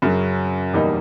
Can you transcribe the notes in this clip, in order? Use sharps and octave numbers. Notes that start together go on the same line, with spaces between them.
F#2 C#3 F#3
E2 B2 G3 A#3 D#4